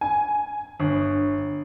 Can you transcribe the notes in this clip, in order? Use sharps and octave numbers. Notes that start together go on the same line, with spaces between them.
G#5
G1